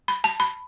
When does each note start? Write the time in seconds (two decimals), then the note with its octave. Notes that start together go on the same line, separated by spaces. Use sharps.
0.08 B5
0.24 A5
0.40 B5